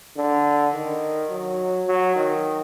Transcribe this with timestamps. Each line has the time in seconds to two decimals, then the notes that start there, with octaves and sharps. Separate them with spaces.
0.17 D3
0.74 D#3
1.31 F#3
1.87 F#3
2.16 D#3